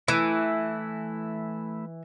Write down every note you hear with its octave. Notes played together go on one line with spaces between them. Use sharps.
E3 A3 E4